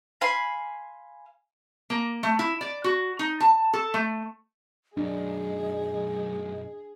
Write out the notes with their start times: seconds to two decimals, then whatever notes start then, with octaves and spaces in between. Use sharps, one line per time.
0.21 F5 G#5 B5 C6
1.90 A#3
2.23 A3
2.39 E4
2.61 D5
2.84 F#4
3.19 D#4
3.40 A5
3.73 A4
3.94 A3
4.97 B1 F#2 D4 G#4 D#5